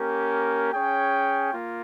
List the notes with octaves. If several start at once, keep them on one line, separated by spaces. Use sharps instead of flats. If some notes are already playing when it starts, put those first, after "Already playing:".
Already playing: A#3 C#4 G4 A#4
C#4 G#4 C#5 G5
A#3 F4